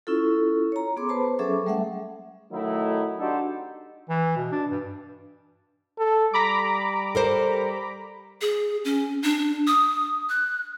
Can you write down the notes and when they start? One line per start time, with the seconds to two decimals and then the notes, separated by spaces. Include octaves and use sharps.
0.07 C#4 E4 F4 A4
0.72 C#5 A#5
0.97 B3 G#4 C6 D6
1.09 B4 C5 A5 B5
1.39 F#3 C#4 G#4 A4 E5 D6
1.66 G3 A3 E5 F#5
2.52 D#3 F#3 A3 D#4 E4
3.19 D4 D#4 F#4 G4 A4 C5
4.09 E3
4.36 B2
4.52 D4
4.71 G2
5.99 A4
6.33 G3 A#5 B5 D6
7.15 A4 A#4 C5
8.41 G#4
8.85 C#4
9.23 D4
9.67 D#6
10.29 F#6